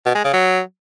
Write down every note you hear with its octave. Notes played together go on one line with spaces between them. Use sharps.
B2
G#3
C#3
F#3